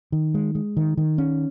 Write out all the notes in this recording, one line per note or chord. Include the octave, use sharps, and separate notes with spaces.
D#3
G#3
G#3
D#3
D#3
C#4